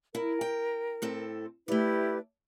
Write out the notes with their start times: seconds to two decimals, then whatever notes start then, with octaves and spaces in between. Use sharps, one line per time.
0.15 E4 A#4
0.41 G5
1.02 A2 C4 A4
1.68 A3 E4 G4 B4 D5